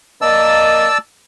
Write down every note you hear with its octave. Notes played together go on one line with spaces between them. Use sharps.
A#3 D5 D#5 A5 E6